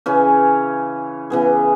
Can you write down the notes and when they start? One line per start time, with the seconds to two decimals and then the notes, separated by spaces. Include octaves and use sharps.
0.06 C#3 E3 C#4
1.30 C#3 E3 B3 G#4